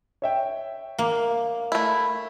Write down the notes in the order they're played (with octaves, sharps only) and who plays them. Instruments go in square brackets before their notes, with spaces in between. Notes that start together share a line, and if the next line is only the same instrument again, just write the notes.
[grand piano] C#5 E5 G5
[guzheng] A#3
[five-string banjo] A3 E4